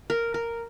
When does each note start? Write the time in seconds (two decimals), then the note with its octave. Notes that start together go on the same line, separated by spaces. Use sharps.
0.10 A#4
0.34 A#4